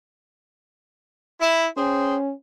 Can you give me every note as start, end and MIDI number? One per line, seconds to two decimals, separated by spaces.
1.41 1.67 64
1.77 2.32 61
1.77 2.16 68
1.77 2.16 72
1.77 2.16 79